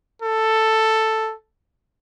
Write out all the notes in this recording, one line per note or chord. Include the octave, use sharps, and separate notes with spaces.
A4